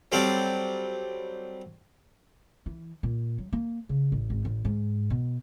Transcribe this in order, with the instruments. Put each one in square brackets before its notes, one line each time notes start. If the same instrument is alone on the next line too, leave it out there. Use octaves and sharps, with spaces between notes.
[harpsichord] F#3 G3 C4 A4 F5
[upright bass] E3
A#2
F#3
A#3
C#3
A1
G#1
A1
G#2
B2